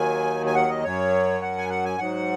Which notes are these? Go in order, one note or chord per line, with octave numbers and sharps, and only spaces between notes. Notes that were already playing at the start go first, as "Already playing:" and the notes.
Already playing: D#2 D#3 F#3 G#5
G#5
F#5
D#5
F#2 F#3 C#5
F#5
G#5
F#5
G#5
G#2 F#3 F#5